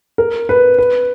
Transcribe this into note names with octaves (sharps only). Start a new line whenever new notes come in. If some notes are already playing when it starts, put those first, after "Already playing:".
A#4
B4
B4